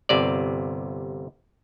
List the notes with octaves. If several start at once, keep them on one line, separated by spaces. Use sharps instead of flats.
G1 C3 D5